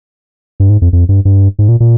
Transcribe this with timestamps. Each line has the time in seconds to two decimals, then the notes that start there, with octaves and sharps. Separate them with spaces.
0.60 G2
0.70 G#2
0.82 F2
0.93 F2
1.09 G2
1.25 G2
1.59 G#2
1.68 A#2
1.80 A#2